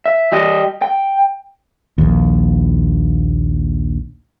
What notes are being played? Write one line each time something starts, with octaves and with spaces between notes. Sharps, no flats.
E5
G3 G4 D#5
G5
A#1 D#2